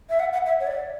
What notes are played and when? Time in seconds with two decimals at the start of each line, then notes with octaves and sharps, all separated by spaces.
0.10 E5
0.20 F#5
0.33 F#5
0.46 E5
0.60 C#5
0.67 D5